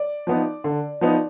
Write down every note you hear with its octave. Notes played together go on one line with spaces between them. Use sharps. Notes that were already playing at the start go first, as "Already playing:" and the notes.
Already playing: D5
F3 B3 D#4
D3
F3 B3 D#4